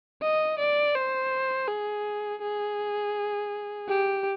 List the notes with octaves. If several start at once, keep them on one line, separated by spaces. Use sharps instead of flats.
D#5
D5
C5
G#4
G#4
G4